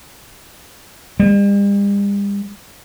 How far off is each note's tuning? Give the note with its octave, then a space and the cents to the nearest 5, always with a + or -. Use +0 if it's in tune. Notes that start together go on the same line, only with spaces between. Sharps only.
G3 +45